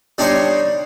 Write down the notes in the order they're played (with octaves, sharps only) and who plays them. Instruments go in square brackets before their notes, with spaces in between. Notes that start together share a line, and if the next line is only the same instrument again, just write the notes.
[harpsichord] G3 D4 D#4 C#5 C6